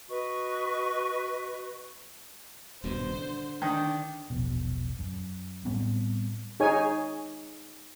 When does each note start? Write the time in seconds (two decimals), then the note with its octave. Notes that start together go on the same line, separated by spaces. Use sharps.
0.08 F#4 B4 D#5 C#6
2.84 D#1 G2 B2 C5
3.15 D3
3.62 D#3 D4
4.30 E1 A#1 B2
4.99 F#2
5.65 A2 G3 B3 C4
6.60 D#4 G#4 C#5 G#5